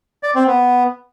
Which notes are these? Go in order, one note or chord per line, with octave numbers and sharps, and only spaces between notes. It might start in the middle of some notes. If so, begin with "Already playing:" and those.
D5
C4
B3